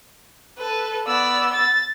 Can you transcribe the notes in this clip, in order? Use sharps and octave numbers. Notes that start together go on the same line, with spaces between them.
A4 B4
B3 D5 E6
A6